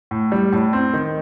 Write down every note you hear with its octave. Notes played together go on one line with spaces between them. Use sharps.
A2
G3
A2
C4
D#3